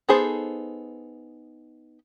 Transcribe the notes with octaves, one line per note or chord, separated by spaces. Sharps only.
B3 D#4 G#4 A4 C5